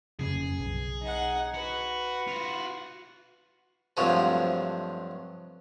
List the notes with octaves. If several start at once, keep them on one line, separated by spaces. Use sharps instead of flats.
F1 F#2 C#3 G#4
B1
D#4 F#5
F#4 B4
F4 F#4
G2 C3 F3 F#3 G#3 A3